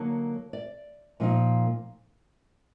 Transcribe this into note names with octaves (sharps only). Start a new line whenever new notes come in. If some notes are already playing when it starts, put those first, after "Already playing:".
Already playing: D3 F#3 A#3 D#4 C#5
D5
A#2 F3 A#3 D#4